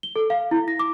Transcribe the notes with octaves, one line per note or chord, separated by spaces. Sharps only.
G7
A4
F5
E4
A#6
D6